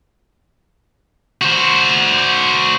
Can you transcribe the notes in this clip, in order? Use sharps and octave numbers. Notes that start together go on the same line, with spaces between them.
F#4 C5